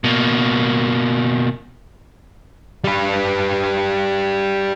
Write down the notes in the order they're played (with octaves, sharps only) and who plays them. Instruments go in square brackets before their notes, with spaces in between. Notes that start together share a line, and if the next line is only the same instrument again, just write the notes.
[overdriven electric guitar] B2 A#3
[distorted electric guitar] G3 B4